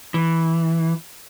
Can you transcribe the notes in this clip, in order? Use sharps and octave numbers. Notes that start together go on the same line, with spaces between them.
E3